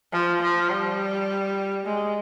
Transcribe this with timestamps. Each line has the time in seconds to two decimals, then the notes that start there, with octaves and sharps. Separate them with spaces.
0.12 F3
0.42 F3
0.70 G3
1.86 G#3